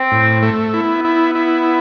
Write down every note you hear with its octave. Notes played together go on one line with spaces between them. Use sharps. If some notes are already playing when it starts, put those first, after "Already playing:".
Already playing: C4
A2
A3
B3 E4
E4
E4